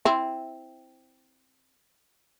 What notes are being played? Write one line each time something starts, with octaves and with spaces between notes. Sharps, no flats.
C4 E4